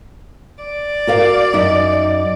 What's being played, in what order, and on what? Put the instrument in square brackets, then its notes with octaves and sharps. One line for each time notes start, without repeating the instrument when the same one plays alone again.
[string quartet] D5
[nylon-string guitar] F#4 A#4 F5
F#2 D#4 E5